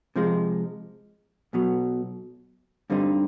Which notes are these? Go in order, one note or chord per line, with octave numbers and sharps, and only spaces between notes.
C3 F3 G#3
B1 B2 F#3
G2 D3 G3 C4 D#4